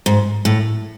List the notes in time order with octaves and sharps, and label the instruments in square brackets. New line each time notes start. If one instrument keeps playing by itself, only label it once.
[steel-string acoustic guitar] G#2
A2